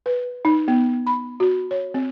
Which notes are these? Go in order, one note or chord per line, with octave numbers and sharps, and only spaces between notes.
B4
D#4
B3
B5
F#4
C#5
C4